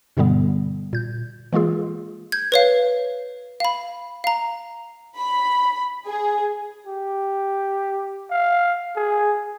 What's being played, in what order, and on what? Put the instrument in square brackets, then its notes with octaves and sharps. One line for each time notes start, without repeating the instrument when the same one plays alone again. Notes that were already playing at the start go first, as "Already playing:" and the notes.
[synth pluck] G2 B2 D3 G3 B3
A#2 G6
E3 G#3 A#3 F4 G#4
[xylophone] G6 G#6
B4 C#5 F5
F5 B5
F5 A#5
[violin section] B5
G#4
[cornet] G4
F5
G#4